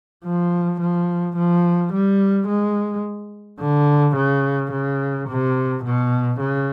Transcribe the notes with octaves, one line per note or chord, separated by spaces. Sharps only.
F3
F3
F3
G3
G#3
D3
C#3
C#3
C3
B2
C#3